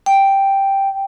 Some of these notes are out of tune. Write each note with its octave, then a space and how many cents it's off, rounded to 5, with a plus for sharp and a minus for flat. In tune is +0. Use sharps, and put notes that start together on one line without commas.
G5 +0